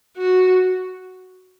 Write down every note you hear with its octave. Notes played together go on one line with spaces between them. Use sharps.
F#4